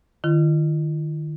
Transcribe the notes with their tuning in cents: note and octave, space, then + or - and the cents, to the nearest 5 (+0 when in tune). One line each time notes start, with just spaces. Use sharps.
D#3 -30 E4 +45